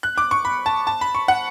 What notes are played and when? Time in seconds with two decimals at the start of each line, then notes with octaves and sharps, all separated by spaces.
0.03 F#6
0.18 D6
0.31 C#6
0.45 B5
0.66 A5
0.87 A5
1.01 B5
1.15 C#6
1.28 F#5